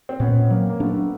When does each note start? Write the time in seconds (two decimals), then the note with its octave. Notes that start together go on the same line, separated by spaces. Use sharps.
0.09 C4
0.20 A#2 B3 C#4
0.50 F#3 A#3 C4
0.69 A#3
0.80 A3 B3 D4